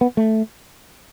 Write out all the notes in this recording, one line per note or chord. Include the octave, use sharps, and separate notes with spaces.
B3
A3